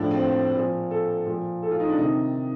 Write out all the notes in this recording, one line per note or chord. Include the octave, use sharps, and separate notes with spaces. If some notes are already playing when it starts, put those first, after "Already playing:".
Already playing: A2 F3 D4
C4
A#2 F3
A4
A#2 F3
A4
F4
D#4
D4
C3 D#3 D#4